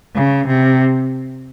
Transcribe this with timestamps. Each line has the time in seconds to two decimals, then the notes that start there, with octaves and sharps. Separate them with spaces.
0.15 C#3
0.47 C3